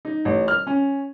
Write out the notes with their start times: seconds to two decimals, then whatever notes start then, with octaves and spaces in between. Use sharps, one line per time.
0.05 D#4
0.25 A1
0.48 F6
0.67 C#4